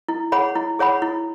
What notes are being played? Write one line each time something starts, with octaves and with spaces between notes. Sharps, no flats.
E4
G#4 C#5 F#5 B5
E4
G#4 C#5 F#5 B5
E4